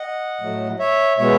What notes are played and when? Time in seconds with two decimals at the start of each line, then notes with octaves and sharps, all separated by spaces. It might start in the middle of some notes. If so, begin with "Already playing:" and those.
Already playing: D#5 F#5
0.41 A2 F#3 A3
0.79 C#5 E5
1.17 B2 G#3 B3 C#5 E5